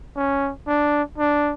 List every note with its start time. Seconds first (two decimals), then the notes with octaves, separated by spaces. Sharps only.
0.16 C#4
0.67 D4
1.18 D4